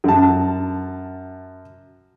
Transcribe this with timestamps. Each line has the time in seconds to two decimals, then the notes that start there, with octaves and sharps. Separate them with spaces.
0.04 F#2 A5